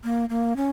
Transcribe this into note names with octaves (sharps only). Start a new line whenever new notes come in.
A#3
A#3
C#4